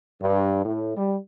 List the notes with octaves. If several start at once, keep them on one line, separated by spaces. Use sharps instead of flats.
G2
A2
G3